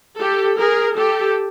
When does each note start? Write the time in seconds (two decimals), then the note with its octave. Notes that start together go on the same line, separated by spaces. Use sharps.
0.19 G4 A4
0.58 G#4 A#4
0.97 G4 A4